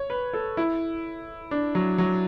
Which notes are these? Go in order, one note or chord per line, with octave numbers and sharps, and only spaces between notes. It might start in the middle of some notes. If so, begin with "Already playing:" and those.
Already playing: C#5
B4
A4
E4
D4
F#3
F#3